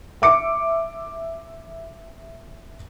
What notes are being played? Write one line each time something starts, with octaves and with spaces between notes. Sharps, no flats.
E5 D6 C#7